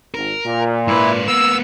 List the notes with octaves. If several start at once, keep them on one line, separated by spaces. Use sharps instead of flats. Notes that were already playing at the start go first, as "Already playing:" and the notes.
G#1 A#4
A#2
G#2 E4 B4
A#3 B3 E6